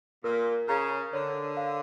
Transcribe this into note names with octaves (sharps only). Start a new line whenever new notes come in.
A#2 A#4
C#3 A#5
D3 C#5
F5